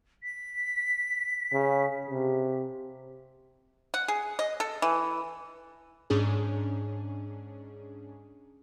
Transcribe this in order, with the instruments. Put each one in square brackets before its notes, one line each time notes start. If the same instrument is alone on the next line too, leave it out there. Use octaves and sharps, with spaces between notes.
[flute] B6
[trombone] C#3
C3
[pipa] F#5
G#4
D#5
A4
E3
[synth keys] G#2 C#4 D4 G#4